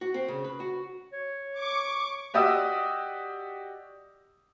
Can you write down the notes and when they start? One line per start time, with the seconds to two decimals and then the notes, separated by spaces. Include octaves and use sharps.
0.01 F#4
0.14 C4
0.28 C#3
0.44 B4
0.60 F#4
1.13 C#5
1.58 C#6 D6
2.34 F#4 G4 D5 D#5 D#6 E6